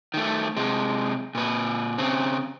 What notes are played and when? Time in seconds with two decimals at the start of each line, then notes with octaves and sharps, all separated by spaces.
0.14 D#3 A3
0.57 C3 G#3
1.35 A#2 B4
1.98 C#3 C4